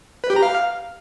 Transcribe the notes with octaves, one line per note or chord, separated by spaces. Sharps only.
B4
G4
A#5
F5